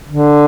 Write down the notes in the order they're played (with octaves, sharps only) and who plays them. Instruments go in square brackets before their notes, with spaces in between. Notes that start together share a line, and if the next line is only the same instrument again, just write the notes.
[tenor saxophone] D3